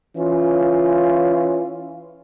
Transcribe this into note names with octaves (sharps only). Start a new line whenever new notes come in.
E3 C#4 F4